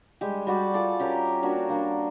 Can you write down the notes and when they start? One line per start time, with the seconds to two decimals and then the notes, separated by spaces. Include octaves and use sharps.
0.21 G3 G#3 G4
0.47 G3 F#4 D5
0.74 F4 A4 D5
1.00 C#4 G4 A#4 D#5
1.43 A#3 D4 F#4 C#5
1.68 G3 A#3 D4